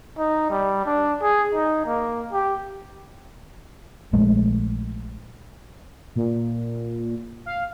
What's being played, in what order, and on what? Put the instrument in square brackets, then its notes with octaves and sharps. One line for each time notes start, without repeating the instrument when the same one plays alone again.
[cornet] D#4
G3
D4
G#4
D#4
A#3
G4
[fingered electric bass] A#1 G#3 A3
[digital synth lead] A#2
F5